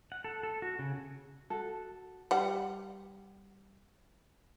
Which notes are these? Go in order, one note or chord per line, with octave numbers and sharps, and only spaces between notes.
F#5
A4
A4
F#4
C#3
F#4 A4
G3 F#5